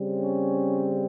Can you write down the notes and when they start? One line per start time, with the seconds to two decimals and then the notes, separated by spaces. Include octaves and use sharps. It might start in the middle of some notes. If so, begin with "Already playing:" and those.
Already playing: C#3 G3 C4
0.23 C#4